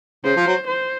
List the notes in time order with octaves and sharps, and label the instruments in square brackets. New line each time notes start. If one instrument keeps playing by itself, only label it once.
[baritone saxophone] C#3 [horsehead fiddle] C5
[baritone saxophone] F3
F#3
[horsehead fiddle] C5